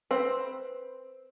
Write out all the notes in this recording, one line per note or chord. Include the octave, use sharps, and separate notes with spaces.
C4 B4